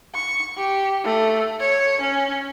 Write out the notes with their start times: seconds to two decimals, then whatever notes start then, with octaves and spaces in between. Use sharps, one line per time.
0.15 C#6
0.57 G4
1.04 A3
1.60 C#5
2.01 C#4